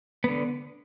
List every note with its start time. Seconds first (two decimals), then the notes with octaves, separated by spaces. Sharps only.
0.24 D3 B3